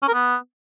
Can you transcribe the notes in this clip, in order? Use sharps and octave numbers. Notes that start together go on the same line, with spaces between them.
C#4
A#4
B3